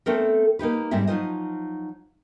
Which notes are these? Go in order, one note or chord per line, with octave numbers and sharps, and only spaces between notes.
A3 B3 C4 D4 A4 A#4
A#3 D#4 G4 B4
G#2 G3 G#3 C4 E5
F3 F#3 D#4 F4 C5 D#5